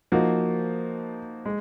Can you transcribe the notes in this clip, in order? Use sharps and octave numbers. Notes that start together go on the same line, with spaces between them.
F3 A#3 D#4 F#4
G#3